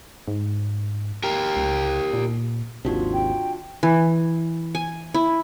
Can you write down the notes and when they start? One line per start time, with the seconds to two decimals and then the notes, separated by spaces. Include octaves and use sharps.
0.28 G#2
1.24 G4 A#4
1.56 C#2
2.13 A#2
2.85 G#1 D#2 C3 D4 F4 F#4
3.13 G5
3.83 E3
4.75 G#5
5.14 E4